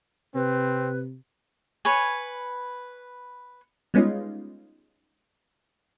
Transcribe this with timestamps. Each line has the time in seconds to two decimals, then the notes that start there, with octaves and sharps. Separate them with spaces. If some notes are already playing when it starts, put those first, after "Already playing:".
0.35 C3 C4 B4
1.85 B4 C#5 G#5
3.94 G3 G#3 B3 C#4 D#4 F4